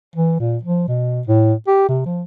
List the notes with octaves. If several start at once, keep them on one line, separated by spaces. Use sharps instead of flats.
E3
A#2
F3
B2
A2
G4
C3
F3